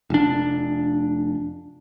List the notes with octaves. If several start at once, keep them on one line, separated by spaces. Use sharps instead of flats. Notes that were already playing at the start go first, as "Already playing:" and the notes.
F1 D4